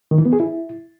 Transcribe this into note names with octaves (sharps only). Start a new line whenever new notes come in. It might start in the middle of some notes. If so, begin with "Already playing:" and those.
D#3
E3
B3
G#4
E4